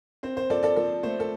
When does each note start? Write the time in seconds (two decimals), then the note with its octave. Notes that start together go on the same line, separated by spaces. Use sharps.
0.23 C4 C5
0.37 C5
0.50 F3 A4 D5
0.63 A4 D5
0.76 F3 A4
1.03 A3 C5
1.20 A4